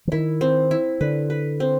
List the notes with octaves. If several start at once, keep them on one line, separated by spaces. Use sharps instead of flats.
E3
D#3 E4
C4
E4
D3 B4
B4
C4